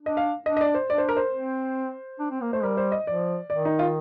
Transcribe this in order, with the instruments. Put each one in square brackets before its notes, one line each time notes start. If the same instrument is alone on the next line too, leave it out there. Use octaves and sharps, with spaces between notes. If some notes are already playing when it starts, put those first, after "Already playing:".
[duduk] D4 [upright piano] D#5
[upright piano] F5
[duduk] D4 [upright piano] D#5
[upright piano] D#5
D5
C5
[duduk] D4 [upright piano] D5
[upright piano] C5
A#4
C5
[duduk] C4
D4
C4
A#3
[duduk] A3 [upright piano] C5
[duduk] G3 [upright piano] A#4
[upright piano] C5
D#5
[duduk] F3 [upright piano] D5
[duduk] D#3 [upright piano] D5
[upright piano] D#4
F4